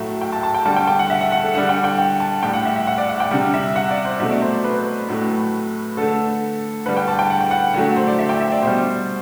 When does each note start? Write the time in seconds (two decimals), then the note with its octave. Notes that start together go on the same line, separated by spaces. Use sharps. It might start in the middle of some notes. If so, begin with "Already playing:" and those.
Already playing: A2 F#3 A3 E5
0.21 G5
0.32 A5
0.43 A5
0.54 G5
0.65 D3 G3 A5
0.76 G5
0.87 G5
0.99 F#5
1.10 E5
1.21 F#5
1.32 F#5
1.43 A4
1.54 D3 G3 F#5
1.69 G5
1.84 G5
1.98 G5
2.20 A5
2.43 A2 G3 G5
2.54 F#5
2.65 E5
2.76 E5
2.87 F#5
2.98 D5
3.09 F#5
3.20 G5
3.31 C3 G3 F#5
3.54 E5
3.76 F#5
3.91 D5
4.05 C5
4.20 B2 F#3 A3 E5
4.31 D5
4.42 C5
4.64 B4
5.09 A2 F#3 A3
5.97 D3 A3 A4
6.86 D3 G3 B4
6.97 G5
7.08 A5
7.19 G5
7.30 F#5
7.41 G5
7.51 F#5
7.74 D3 F#3 A3
7.96 C5
8.07 D5
8.19 E5
8.29 G5
8.41 E5
8.52 D5
8.63 B2 G3 C5